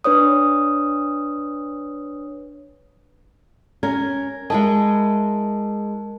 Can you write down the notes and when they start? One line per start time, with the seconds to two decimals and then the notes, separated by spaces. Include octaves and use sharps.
0.04 D4 B4 C#5 D#6
3.83 C#4 A#4 G#6
4.50 G#3 E4 A#4 D#5 G#5 A5